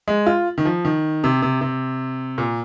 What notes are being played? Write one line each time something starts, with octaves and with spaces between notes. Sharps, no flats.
G#3
F4
D#3
F3
D#3
C3
C3
C3
A#2